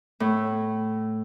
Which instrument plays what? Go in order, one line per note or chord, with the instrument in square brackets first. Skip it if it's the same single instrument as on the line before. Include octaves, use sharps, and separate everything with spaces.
[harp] A2